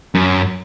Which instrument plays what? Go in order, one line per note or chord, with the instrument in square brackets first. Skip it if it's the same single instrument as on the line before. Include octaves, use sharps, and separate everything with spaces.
[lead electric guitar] F#2